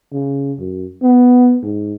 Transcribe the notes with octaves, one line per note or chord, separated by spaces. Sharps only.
C#3
F#2
B3
G#2